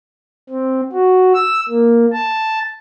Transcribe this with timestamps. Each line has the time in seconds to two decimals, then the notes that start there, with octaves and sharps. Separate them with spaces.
0.50 C4
0.92 F#4
1.34 E6
1.68 A#3
2.13 A5